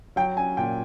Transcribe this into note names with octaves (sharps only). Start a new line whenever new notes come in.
F#3 G5
C#4 G#5
A#2 G5